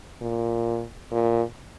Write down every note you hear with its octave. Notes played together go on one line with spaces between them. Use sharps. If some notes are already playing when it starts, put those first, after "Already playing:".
A#2
A#2